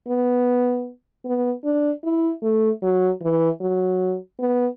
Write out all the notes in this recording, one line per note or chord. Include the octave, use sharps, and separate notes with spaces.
B3
B3
D4
E4
A3
F#3
E3
F#3
B3